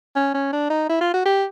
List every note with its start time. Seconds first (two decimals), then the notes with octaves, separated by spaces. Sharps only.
0.16 C#4
0.34 C#4
0.53 D4
0.70 D#4
0.89 E4
1.00 F4
1.14 F#4
1.25 G4